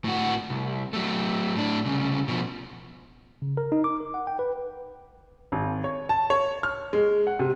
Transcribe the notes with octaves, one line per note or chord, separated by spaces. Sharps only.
A2 F#4
C2
F#3 A3
A2 D4
C2 C#3
B2 F3
C#3
A#4
D#4
D6
A#4
F#5
G5
B4
G#1
C#5
A5
C#5
F6
G#3
F#5
C3